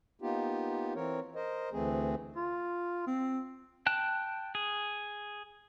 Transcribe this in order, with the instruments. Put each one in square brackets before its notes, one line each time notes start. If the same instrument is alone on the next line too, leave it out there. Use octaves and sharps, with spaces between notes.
[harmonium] A#3 B3 D#4 F4 G4
E3 C4 A#4 C#5
A#4 C5 D#5
D2 E3 A3 C4 G#4
[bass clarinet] F4
C4
[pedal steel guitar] G5 A5 F#6
G#4